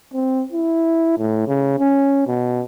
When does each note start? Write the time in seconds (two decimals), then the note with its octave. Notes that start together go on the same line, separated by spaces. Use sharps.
0.14 C4
0.52 E4
1.19 A2
1.47 C#3
1.79 C#4
2.27 B2